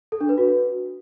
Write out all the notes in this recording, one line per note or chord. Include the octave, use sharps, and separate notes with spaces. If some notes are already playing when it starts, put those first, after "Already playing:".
A4
D4
B4
F#4